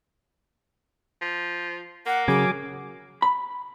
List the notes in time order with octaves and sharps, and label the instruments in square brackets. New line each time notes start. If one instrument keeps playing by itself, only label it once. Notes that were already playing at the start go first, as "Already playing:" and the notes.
[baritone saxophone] F3
[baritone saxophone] A#3 [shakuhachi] F#5
[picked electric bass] C#3 [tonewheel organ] F#3 G#5 D6 [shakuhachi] G#4
[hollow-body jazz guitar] B5